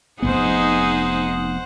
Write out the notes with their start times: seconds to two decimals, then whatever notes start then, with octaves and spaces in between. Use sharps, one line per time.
0.22 F1 D#2 B3 D#4 G#4 C5 F#5